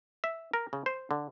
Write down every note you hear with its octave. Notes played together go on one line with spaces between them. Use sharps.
E5
A#4
C#3
C5
D3